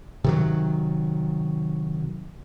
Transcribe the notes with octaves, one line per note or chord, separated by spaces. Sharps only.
C3 D#3 F#3